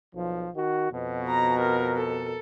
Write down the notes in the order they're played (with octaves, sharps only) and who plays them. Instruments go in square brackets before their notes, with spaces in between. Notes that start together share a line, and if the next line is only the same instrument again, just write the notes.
[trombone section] B1 F3
D#3 F#4
F2 B2
[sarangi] A#5
A#4
A4